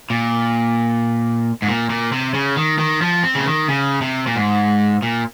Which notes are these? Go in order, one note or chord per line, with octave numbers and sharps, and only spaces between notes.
A#2
G#2
A#2
A#2
C3
C#3
D#3
D#3
F3
C4
C#3
D#3
C#3
C3
A#2
G#2
A#2